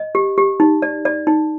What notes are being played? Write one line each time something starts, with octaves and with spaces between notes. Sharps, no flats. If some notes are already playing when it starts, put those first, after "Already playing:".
Already playing: D#5
G4
G4
D#4
D5
D5
D#4